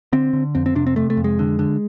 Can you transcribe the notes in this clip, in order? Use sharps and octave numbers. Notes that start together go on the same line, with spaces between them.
D3 C4
D3
F2 C4
C4
C3 D4
C4
C3 A3
A3
F2
G#3
D3
D3